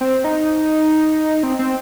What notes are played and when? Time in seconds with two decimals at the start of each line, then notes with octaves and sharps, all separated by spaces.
0.01 C4
0.24 D#4
1.43 C4
1.59 C4